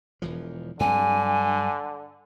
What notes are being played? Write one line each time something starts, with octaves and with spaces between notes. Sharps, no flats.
E1 E3 F3
G2 D3 F#3 C4 G#5